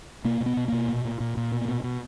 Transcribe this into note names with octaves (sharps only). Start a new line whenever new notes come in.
B2 A#3
B2
B3
B2
B2 A#3
A#2
A#2
A#2
A#2
B2
B2
B2